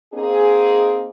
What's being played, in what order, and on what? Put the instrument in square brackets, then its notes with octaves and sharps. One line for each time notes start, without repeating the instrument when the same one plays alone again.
[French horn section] A#3 C4 D#4 G#4